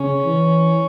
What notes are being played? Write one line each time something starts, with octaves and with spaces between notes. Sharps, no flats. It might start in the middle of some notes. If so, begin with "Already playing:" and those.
Already playing: C#3 C#4
E3